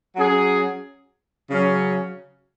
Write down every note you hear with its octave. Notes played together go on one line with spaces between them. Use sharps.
F#3 C#4 G#4
C#3 F#3 C#4